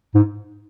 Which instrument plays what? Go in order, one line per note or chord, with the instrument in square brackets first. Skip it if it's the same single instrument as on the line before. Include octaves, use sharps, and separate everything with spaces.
[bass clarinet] G#2